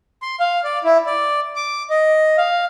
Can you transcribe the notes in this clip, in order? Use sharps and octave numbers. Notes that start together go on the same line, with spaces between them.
C6
F5
D5
E4
D5
D6
D#5
F5